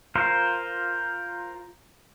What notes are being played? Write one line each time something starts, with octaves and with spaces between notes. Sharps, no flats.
F4 A#4 C5 F5